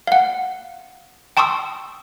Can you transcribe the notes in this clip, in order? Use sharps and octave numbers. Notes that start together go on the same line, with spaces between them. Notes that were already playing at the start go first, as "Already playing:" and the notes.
F5 F#5
G5 A5 C6 C#6 D#6 E6